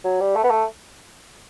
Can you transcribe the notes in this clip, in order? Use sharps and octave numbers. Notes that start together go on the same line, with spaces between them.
F#3
G3
A3
B3
A3